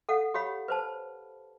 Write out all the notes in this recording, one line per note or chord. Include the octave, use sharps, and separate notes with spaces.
A4 F5 F#5
G4 C#5 F5 B5
B4 C5 A5